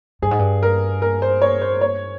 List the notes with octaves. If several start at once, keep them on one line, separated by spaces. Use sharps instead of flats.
G2 G#4
G#2
G2
A#4
A#4
C5
C#5
C5
C#5